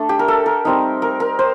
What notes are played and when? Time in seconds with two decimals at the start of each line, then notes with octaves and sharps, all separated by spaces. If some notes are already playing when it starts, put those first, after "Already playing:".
Already playing: A3 D4
0.09 G4
0.19 A#4
0.28 A4
0.46 A#4
0.65 G3 C4 D#4
1.02 A#4
1.20 A#4
1.39 C5